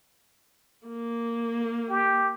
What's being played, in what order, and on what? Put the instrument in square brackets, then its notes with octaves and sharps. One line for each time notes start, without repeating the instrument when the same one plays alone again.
[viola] A#3
[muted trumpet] G4